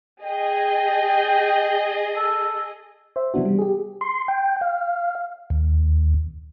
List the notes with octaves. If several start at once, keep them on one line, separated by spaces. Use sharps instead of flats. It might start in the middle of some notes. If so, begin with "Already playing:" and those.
G#4 D#5 G5
A4
C5 E5
C3 E3 F#3 B3 D4 F#4
G3
G4 G#4
C6
G5
F5
D#2